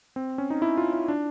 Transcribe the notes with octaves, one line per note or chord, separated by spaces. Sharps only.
C4
C#4
D#4
E4
F4
E4
D4